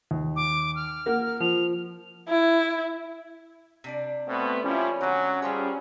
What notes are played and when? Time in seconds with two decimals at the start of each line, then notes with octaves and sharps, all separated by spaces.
0.11 D#2
0.36 D6
0.76 F6
1.06 A#3 A#4 F#5
1.40 F3 F7
2.29 E4
3.84 C3 D4 D5
4.27 B2 A3 B3 C4
4.64 F3 G3 C#4 E4
5.01 D3 F#3 G#3 C4
5.42 F3 G3 G4 G#4 C5 C#5